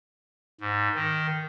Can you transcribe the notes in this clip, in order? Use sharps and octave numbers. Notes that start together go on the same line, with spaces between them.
G#2
D#3